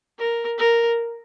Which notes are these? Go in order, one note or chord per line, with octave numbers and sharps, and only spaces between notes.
A#4
A#4